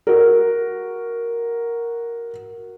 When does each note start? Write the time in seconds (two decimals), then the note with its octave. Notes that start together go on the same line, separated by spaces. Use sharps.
0.07 F#4 A#4